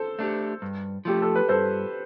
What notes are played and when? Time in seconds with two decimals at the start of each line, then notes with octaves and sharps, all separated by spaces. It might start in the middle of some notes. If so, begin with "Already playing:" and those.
Already playing: A4 C5
0.19 A3 D4 G4
0.62 G2
1.05 F3 A3 G4
1.22 A4
1.35 B4
1.48 G2 A4 C5